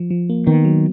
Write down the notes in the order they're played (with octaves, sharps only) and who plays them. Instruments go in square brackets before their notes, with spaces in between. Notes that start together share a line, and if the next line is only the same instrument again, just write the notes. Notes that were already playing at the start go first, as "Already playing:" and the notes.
Already playing: [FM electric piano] F3
F3
A#3
[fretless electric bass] D#3 [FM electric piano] B3
[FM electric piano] F#3